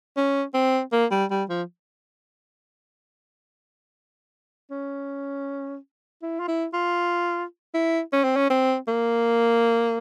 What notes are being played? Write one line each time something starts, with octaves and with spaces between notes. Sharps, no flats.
C#4
C4
A#3
G3
G3
F3
C#4
E4
F4
E4
F4
E4
C#4
C4
C#4
C4
A#3